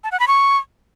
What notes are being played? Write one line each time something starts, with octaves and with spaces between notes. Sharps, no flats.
A5
F#5
B5
C#6